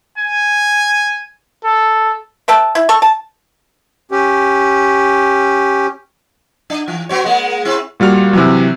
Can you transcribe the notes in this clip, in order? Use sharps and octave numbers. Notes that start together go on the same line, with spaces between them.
G#5
A4
B4 E5 G5 A5
E4
A4 C#6
A5
C#4 G4
D4
E3
B3 F#4 C#5
G#3 A#3
C4 E4
A#2 G3 F#4 F6
C3 E3 F#3